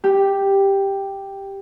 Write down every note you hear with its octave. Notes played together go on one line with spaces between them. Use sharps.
G4